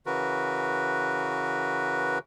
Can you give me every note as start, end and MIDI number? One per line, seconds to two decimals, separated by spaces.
0.06 2.18 49
0.06 2.18 52
0.06 2.18 66
0.06 2.18 70
0.06 2.18 71